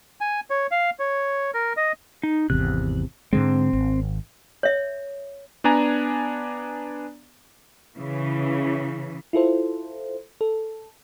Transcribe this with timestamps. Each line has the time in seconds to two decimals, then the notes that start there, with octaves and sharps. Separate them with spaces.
0.21 G#5
0.50 C#5
0.71 F5
0.99 C#5
1.54 A#4
1.77 D#5
2.23 D#4
2.50 G#1 E2 C3 F#6
3.33 G#2 D3 G#3 C4
3.73 G#1
4.63 C#5 E5
5.64 B3 D4 D5 G#5 A#5
7.97 C#3 E3
9.33 E4 F4 A4 C5
10.41 A4